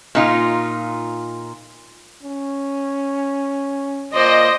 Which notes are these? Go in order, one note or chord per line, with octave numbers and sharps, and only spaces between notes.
A#2 D#4 F4
C#4
A#2 C5 D5 D#5